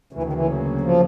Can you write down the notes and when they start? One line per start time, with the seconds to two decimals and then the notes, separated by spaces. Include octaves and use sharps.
0.13 D2 C#3 E3 F#3 A#3
0.23 D#3
0.33 E3
0.81 F3